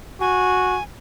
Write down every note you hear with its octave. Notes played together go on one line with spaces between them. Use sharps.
F#4 G#5